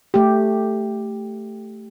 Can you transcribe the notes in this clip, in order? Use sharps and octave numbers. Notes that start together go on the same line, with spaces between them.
A3 G4